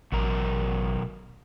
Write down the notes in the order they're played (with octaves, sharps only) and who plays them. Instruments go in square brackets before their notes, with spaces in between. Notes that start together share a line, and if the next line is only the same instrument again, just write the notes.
[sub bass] A1 [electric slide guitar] B2 F#3 A#4